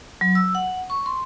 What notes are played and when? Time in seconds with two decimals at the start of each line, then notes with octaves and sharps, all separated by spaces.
0.21 F#3
0.35 E6
0.55 F#5
0.90 C#6
1.06 C6